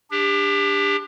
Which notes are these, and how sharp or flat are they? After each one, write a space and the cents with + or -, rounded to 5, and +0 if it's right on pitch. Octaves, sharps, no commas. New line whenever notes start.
D4 +0 G4 +30